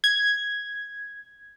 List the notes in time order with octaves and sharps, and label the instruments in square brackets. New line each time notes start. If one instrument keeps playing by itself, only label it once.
[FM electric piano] G#6